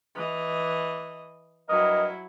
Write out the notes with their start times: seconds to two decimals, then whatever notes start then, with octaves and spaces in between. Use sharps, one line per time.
0.15 E3 D#5
1.69 G2 F#3 E4 A#4 D#5